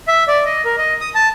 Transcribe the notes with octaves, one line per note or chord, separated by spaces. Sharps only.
E5
D5
D#5
A#4
D#5
D#6
A5